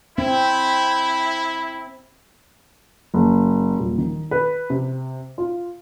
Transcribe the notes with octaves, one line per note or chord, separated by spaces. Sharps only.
C4 E4
F#1
D#1
D#3
B4
C3
F4